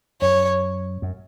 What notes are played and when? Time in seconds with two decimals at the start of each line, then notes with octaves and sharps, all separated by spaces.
0.21 F#2 C#5
1.02 F#2